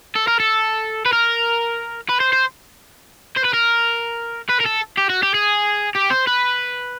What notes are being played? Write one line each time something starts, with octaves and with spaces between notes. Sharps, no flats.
A4
A#4
A4
B4
A#4
B4
C5
C5
C5
B4
A#4
B4
A#4
A4
G4
F#4
G4
G#4
G4
C5
B4